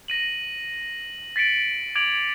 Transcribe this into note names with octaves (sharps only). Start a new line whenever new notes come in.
A#6 D#7 F#7
A6 B6 C#7 D7 F#7
D6 G#6 D7 F7 F#7